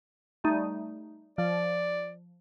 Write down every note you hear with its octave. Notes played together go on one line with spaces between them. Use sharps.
G3 A3 D#4
F3 D5